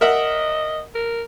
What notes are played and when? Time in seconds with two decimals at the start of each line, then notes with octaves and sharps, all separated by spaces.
0.01 A#4 D#5 E5 F#5
0.95 A#4